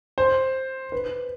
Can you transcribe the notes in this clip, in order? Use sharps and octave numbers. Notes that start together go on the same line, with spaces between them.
C5
B4